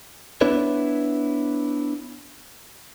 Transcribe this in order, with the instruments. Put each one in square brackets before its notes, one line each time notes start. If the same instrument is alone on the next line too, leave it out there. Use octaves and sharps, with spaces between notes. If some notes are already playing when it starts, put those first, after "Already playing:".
[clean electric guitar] B3 D4 E4 B4 C#5